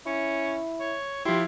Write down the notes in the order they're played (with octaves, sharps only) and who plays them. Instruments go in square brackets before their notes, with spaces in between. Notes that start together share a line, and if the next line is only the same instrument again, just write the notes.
[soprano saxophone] C#4 [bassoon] E4
[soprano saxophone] C#5
[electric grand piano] F3 E4 [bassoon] G4 [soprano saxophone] C6